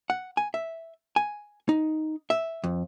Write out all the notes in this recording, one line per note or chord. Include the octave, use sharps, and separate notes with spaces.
F#5
G#5
E5
G#5
D#4
E5
F2